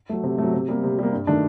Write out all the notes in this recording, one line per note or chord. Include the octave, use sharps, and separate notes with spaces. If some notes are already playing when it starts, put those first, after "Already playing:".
F#3 A3
C3
F#3 A3
C3
G3 A#3
C3
G3 A#3
G2
D#3 A3 D4